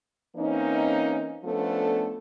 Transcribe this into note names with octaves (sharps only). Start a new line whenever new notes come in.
E3 A#3 C4 C#4 D#4
F3 A3 B3 C#4 D4 A4